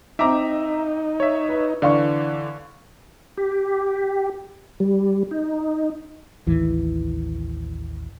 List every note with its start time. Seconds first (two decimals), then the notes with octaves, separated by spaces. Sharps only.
0.19 C4 D#4 E5 A#5 D6
1.20 C#5 E5
1.49 B4
1.82 D3 E3 D5 F5 C#6
3.37 G4
4.80 G3
5.31 D#4
6.46 A1 D#2 E3